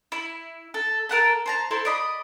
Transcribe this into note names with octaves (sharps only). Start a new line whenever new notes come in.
E4
A4
A4 A#4 F#5 A5
C5 A5 A#5
E4 A4 C5
D5 D#5 B5